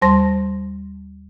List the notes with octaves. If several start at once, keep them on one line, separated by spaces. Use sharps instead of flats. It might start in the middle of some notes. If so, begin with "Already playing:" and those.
D#2 G3 C5 A5 C6 A#6